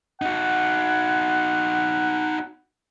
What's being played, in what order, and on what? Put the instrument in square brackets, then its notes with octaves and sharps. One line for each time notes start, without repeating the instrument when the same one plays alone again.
[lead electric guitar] D#4 F#4 [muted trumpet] F#5